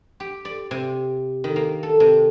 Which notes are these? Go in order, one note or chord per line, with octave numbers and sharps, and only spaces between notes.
G4
D5
C3
D#3
A#3
A4
C3